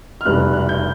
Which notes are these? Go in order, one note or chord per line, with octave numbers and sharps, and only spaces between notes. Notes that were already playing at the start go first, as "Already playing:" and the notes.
F6
F1 E2 B2 G3 F#6
F#6
G6